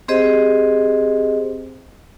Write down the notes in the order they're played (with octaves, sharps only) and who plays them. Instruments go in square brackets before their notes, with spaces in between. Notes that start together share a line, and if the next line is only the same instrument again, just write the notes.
[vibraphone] C4 G4 G#4 C5 D#5